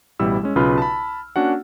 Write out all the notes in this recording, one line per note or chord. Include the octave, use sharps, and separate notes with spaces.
A1 B2 G3 E4 E6
G#3 C#4
B1 C#3 F4 B4 B5 F6
A5 B5
A#3 C#4 D4 F#4 F#5